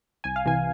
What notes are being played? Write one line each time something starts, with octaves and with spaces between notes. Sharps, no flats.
C2 G#5
F5
C3 E3 G#5